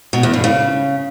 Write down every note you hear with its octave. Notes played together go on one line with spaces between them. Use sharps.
B2
E2
G2
C#3